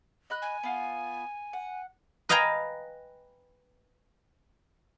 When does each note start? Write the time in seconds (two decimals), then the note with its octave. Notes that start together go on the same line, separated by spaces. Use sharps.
0.30 D#5 B5 F#6
0.42 G#5
0.63 B3 F4
1.53 F#5
2.29 B4 D#5 F5 G5 G#5 A#5